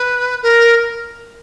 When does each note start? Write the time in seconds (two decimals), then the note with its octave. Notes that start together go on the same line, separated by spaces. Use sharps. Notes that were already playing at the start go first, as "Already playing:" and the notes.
Already playing: B4
0.42 A#4